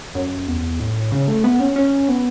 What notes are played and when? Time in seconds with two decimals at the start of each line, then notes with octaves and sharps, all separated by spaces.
0.15 F#2
0.47 E2
0.80 A2
1.12 C#3
1.28 A3
1.44 B3
1.60 C#4
1.76 C#4
2.08 B3